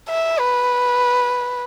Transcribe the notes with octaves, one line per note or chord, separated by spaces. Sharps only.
E5
B4